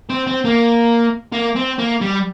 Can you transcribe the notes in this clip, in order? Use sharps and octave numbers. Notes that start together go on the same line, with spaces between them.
C4
C4
A#3
A#3
C4
A#3
G3